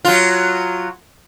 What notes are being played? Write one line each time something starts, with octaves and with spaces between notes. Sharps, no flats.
F#3 F4